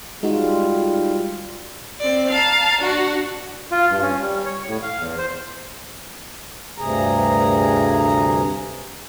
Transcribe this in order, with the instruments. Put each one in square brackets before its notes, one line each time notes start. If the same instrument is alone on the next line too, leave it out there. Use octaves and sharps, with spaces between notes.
[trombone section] G3 F4 [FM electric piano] G#3 D#4 F#4
[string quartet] C4 D5
F5 A5 A#5
D4 F#4 F#5
[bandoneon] F4
G2
C#4
G3
C#5
A2
F5
E2
C5
[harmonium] D2 G2 C3 G#4 A#5